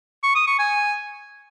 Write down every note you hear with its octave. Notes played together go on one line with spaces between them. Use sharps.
C#6
D#6
C#6
G#5